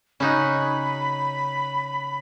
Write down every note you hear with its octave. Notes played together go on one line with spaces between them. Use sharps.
C#3 C#4 D#4 F#4 B5